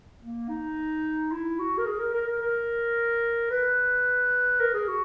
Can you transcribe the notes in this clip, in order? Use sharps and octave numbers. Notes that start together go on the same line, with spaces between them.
A#3
D#4
E4
F#4
A#4
G#4
A#4
A#4
A#4
A#4
B4
A#4
G#4
F#4